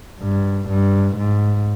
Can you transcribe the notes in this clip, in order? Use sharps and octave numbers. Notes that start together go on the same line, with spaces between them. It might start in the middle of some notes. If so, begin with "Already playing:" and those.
G2
G2
G#2